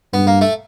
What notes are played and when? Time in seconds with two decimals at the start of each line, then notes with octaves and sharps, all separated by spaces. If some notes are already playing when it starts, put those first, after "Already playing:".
0.14 G2 B3
0.27 A#3
0.41 A3